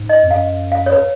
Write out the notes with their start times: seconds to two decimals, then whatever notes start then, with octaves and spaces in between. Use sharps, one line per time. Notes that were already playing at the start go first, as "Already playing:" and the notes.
Already playing: G#2
0.09 D#5
0.23 F2
0.31 F#2 F5
0.72 F5
0.86 C#5
0.93 B4